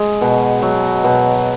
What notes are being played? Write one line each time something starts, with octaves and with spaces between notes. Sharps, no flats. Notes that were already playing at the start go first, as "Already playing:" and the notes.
Already playing: G#3
B2
F#3
B2